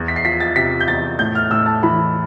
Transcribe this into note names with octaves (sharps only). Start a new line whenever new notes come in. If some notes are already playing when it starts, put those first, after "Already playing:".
Already playing: E2
B6
C7
F3 B6
A6
C3 B6
G6
E2 A6
A2 G6
F6
A2 E6
A5
E3 B5